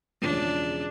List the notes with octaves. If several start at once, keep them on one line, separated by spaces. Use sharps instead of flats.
E1 C#3 F3 D4